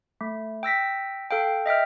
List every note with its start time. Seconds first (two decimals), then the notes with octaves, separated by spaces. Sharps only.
0.21 A3
0.63 G5 E6 A#6 B6
1.31 A4 F5 G5
1.66 D#5 E5 G5 F6